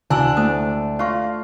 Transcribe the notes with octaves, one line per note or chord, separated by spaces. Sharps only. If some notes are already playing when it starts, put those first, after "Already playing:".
D2 D4 E4 F#4 G#5 E6 F#7
A3 C5 D#6
F4 C#5 F5 C#6 A#6